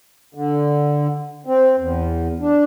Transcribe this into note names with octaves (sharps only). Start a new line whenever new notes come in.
D3
C4
E2
D4